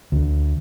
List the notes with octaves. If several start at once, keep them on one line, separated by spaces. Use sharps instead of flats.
D2